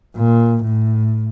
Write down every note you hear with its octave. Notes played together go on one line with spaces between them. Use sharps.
A#2
A2